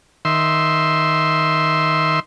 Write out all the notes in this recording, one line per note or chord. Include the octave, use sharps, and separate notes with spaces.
D#3 E5 C6